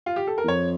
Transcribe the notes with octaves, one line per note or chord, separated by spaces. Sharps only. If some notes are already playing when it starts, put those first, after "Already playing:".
F4
G4
A4
A#4
E2
F2 C#5